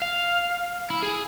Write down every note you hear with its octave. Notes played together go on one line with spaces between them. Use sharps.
F5
E4
G#4